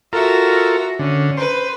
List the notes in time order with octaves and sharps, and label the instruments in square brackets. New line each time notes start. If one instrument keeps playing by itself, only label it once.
[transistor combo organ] F4 A4 A#4 [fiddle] F#4 E5
[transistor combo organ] D3 [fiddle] C#4
[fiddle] B4 [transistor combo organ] C5